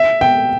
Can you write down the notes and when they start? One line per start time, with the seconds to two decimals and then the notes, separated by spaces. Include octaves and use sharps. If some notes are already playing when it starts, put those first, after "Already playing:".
Already playing: E5
0.21 G5